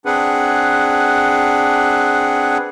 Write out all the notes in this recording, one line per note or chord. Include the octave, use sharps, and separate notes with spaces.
C4 D4 G#4 B4 F#5